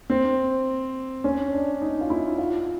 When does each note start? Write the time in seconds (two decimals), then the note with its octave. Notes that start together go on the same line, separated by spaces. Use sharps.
0.10 C4
1.24 C#4
1.52 D4
1.81 D#4
2.01 F4
2.10 E4
2.38 F4